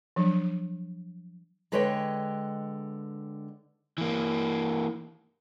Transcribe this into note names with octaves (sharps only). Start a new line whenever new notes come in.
F3 F#3 D4
D3 G#3 B4 C#5 D#5 G5
E3 A#3